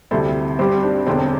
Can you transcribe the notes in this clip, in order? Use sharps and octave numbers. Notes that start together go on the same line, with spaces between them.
D2 C3 G3 C4 E4 A4
G2 G3 C4 G4 C5
D4 G4
E1 E2 D3 C4 D5 G5